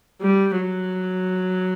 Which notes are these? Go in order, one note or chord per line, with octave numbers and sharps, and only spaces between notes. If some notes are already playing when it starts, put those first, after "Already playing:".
G3
F#3